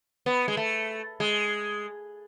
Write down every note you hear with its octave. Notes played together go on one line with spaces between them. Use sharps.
B3
G#3
A3
G#3